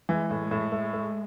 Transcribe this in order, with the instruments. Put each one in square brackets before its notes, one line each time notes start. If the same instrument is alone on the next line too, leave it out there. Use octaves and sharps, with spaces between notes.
[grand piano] E3 [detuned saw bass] G#3
[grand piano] A2
[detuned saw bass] G#3
[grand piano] A2
[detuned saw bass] G#3 [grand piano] A3
[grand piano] A3